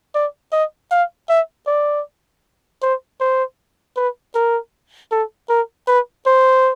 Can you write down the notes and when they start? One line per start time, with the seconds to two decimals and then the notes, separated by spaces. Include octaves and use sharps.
0.15 D5
0.52 D#5
0.91 F5
1.29 E5
1.67 D5
2.82 C5
3.20 C5
3.97 B4
4.35 A#4
5.12 A4
5.50 A#4
5.88 B4
6.26 C5